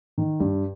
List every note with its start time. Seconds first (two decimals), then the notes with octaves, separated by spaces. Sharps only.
0.18 D#3
0.40 G2